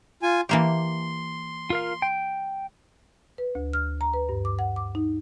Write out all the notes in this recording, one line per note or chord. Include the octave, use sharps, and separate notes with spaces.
F4 G#5
E3 A#3 G4 C6
F4 A#4 F5
G5
B4
D2
F6
A#5
B4
G2
D6
F#5
D6
D#4